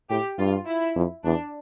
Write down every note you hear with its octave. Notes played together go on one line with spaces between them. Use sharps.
A2 G4
G2 F4
E4
F2
E2 D4